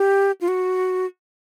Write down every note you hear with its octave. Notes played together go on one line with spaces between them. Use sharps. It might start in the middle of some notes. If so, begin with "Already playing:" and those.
Already playing: G4
F4
F#4